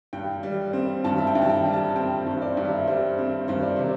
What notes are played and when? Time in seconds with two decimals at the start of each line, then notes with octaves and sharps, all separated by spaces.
0.13 G2 G5
0.43 G3
0.73 C4
1.04 G2 A5
1.18 E5
1.27 G5
1.35 G2
1.42 A5
1.49 G5
1.65 G3
1.73 A5
1.96 C4 G5
2.27 G2 C5
2.42 D5
2.57 G2
2.64 E5
2.87 G3 C5
3.18 C4
3.48 G2 C5
3.62 D5
3.76 C3 C5